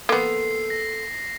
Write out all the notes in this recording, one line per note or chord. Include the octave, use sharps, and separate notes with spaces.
A#3 B3 A4 C6 C7
A#6